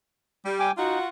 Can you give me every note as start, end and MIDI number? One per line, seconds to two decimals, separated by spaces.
0.45 0.69 55
0.60 0.71 79
0.60 0.71 80
0.60 0.71 86
0.78 0.98 63
0.78 1.09 65
0.78 1.09 66